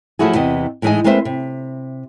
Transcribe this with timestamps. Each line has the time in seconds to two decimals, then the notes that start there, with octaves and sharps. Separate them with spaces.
0.19 F3 F#3 A3 E4 F#4 G#4
0.34 E2 C3 E3 B3 D#5
0.82 A2 E3 G#3 D#4 D#5 G#5
1.04 G#3 A#3 C4 B4 C5 E5
1.25 C3